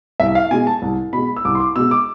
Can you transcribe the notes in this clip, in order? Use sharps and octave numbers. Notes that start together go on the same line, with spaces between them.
C2 E5
F5
B2 G#3 G#5
A5
C2
B2 G#3 B5
E6
C2 D6
C6
D6
B2 G#3 E6
D6